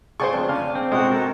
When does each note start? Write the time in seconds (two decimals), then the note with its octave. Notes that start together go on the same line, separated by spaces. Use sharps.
0.20 C#3 C5 D5 G5 G#5 C#6
0.33 F2 D4
0.49 C#3 G#5 D6 F6
0.75 C4
0.91 B1 G#3 F#4 C6 D#6
1.09 A4 A#4 A#5